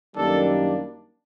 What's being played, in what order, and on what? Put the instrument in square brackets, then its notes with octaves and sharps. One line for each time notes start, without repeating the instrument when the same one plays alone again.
[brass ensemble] F#2 D#3 G3 A#3 D4 A4